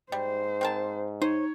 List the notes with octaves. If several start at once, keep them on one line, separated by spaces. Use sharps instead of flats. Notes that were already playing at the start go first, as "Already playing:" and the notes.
G#2 G3 C5
C4 A#4 A5
D#4 C5 C#5